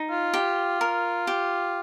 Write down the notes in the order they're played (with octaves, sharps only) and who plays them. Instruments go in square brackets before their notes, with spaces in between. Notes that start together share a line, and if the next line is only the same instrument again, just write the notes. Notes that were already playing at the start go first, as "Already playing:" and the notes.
Already playing: [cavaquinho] D#4
[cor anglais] F4
[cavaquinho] G4
A#4
G4